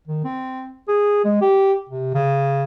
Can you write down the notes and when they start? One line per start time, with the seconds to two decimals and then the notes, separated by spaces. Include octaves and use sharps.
0.08 D#3
0.24 C4
0.88 G#4
1.25 G#3
1.41 G4
1.89 C3
2.14 C#3